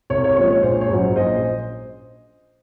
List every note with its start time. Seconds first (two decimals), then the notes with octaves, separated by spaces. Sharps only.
0.10 C2 C#5
0.24 C#5
0.36 A#2 F3 G#3 C#4 C#5
0.50 C#5
0.63 A#1 C5
0.81 C#5
0.89 G#2 F#3 C#4
0.99 C5
1.16 A#1 C5 D#5